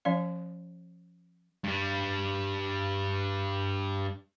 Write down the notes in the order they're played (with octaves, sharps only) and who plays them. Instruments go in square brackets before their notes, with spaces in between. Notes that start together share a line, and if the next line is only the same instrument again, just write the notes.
[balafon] F3 C#4 D5 F5
[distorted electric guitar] G2 G3